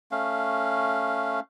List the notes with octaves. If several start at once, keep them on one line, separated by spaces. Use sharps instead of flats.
A3 C#4 F5